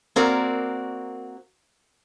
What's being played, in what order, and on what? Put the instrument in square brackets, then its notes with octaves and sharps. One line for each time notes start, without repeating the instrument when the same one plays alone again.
[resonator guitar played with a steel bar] A#3 C4 F#4 A#4 D5